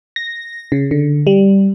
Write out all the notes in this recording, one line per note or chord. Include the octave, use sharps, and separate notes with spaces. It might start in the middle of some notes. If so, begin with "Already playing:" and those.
A#6
C#3
D3
G3